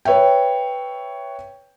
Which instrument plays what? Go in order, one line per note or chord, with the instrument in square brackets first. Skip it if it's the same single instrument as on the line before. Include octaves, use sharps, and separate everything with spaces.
[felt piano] B4 C#5 E5 G5